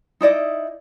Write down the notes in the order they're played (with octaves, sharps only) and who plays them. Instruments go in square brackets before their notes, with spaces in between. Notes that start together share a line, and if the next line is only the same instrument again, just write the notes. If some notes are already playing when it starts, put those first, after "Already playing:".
[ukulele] D#4 E4 D5 D#5